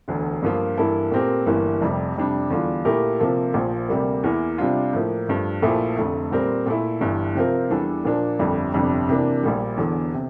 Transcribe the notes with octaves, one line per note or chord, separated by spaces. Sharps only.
E1 D2 D3
G2 F3 A#3 F4
G2 E3 A#3 E4 A4
A#2 A3 C4 G4 A#4
G1 G2 E3 A#3
F1 F2 C3 G3
F2 C3 G3 D4
E2 D3 G3 D4 F4
A#2 A3 E4 G4 A#4
C3 F3 A#3 F4 A4
A#1 A#2 F3
D2 C3 G3 A#3
E2 E3 A#3 E4 A#4
C3 G3 D4 F4
A2 F3 A#3
G2 F3 A3
A#1 A#2 F3 A3 E4
F1 F2 D3 A3
A#2 G3 C4 G4 A#4
A#2 A3 E4
G1 G2 E3
C3 F3 C4 F4 A#4
E2 E3 G3 D4 A4
A#2 F3 A#3 D4
G1 F2 D3 G3
G1 F2 C3 G3 D4
C3 E3 A#3 D4
A#1 A#2 G3
E1 E2 D3
C3